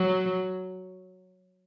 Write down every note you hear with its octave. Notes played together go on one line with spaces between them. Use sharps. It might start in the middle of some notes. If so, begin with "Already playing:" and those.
Already playing: F#3